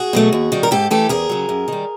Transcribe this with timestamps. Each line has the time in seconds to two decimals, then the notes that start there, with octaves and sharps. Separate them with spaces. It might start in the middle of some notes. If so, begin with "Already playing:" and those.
Already playing: F#4 G#4
0.13 B2 F#3 A3
0.33 D#2
0.52 D#3 G3
0.63 A#4
0.71 G#2 G4 A4
0.91 E3 A3 G4 A4
1.09 E2 G#4 A#4
1.29 C#3 F#3
1.49 F#2
1.68 D#3 G3